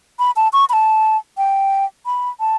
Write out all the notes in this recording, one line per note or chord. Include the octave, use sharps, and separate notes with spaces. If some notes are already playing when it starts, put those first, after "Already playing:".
B5
A5
C#6
B5
A5
G5
B5
A5